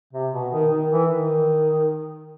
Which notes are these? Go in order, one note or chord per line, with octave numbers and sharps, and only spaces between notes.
C3
B2
D#3
D#3
E3
D#3